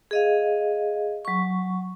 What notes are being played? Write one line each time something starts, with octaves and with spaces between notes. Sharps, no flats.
G#4 D#5 F5
F#3 C#6